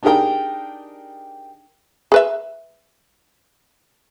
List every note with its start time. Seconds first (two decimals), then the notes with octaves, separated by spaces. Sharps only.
0.03 D4 D#4 G4 G#4 A#4 G5
2.12 G#4 B4 E5